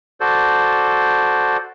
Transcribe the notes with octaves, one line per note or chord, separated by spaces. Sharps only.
F#4 A4 C5 D5